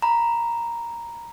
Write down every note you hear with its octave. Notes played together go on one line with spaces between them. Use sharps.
A#5 B5